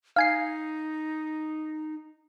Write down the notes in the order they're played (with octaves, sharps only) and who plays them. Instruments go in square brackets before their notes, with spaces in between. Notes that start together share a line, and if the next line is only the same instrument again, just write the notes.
[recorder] D#4 [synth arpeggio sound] F5 G#5 C7